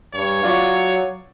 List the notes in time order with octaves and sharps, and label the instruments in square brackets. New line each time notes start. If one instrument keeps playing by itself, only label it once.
[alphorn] G2 [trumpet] C#5
[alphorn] F#3 [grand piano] F4 D5 C#6